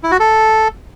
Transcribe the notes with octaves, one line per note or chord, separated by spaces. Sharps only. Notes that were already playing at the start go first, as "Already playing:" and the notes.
E4
F#4
A4